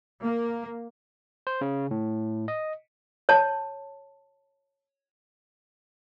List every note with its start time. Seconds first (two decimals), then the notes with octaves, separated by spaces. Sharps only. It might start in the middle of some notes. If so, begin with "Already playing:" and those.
0.23 A#3
1.47 C5
1.61 C#3
1.91 A2
2.48 D#5
3.29 C#5 A5